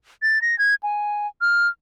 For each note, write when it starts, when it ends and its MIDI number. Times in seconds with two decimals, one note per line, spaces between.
0.22 0.41 93
0.42 0.58 94
0.59 0.75 92
0.83 1.27 80
1.41 1.68 89